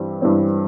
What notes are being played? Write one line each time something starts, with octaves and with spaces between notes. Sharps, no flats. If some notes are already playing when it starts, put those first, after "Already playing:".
Already playing: G2 E3 G3 C4
G2 E3 G3 C4